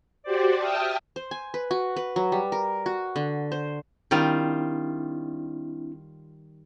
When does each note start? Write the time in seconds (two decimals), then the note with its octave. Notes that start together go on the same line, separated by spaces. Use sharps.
0.23 F#4 G4 C5 D5
0.58 E5 G5 A5 D#6 F6
1.16 C5
1.31 G#5
1.54 B4
1.71 F#4
1.96 B4
2.16 F#3
2.32 G3
2.52 A#4
2.86 F#4
3.16 D3
3.52 C5
4.11 D#3 G3 C4 D4 E4 F4